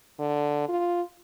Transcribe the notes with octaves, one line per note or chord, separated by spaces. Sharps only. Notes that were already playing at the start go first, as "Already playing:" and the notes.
D3
F4